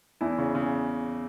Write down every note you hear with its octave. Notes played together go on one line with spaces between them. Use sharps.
E2 E4
C#3
C#3